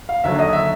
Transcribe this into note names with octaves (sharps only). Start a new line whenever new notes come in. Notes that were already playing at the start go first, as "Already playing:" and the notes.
F5
D#2 D3 F#3 E5
D#5
E5